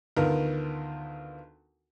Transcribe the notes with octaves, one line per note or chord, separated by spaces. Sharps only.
D2 D#3 B3 F4 A#4